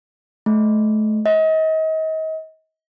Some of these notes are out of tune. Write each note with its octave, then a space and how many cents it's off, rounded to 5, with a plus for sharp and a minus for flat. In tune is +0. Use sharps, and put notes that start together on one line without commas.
A3 -35
D#5 +35